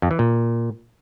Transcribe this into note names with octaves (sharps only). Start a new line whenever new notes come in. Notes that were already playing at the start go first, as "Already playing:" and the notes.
F2
E3
A#2